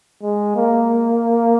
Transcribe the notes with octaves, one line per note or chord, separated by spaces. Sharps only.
G#3
A#3